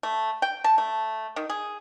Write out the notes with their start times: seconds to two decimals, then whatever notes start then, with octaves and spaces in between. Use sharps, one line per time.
0.03 A3
0.42 G5
0.64 A5
0.78 A3
1.36 D#3
1.50 G#4